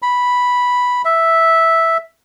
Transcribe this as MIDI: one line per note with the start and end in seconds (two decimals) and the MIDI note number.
0.02 1.02 83
1.05 1.97 76